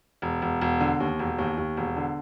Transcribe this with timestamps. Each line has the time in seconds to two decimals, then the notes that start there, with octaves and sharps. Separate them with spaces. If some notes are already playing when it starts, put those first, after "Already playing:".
0.22 E1
0.42 E1
0.61 E1
0.80 D3
1.00 D#2
1.19 E1
1.38 D#2
1.57 D#2
1.77 E1
1.96 D3